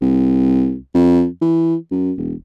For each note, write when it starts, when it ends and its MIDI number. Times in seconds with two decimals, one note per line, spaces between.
0.01 0.76 36
0.94 1.27 41
1.41 1.75 52
1.91 2.12 42
2.18 2.34 28